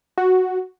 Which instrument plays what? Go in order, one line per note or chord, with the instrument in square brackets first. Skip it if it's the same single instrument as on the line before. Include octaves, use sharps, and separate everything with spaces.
[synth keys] F#4